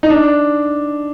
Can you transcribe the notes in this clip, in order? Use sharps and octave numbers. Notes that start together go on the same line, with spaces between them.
D#4
D4